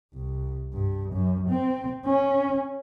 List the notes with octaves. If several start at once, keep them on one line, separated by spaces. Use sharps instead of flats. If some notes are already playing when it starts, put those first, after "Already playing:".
C2
G2
F#2
C4
C#4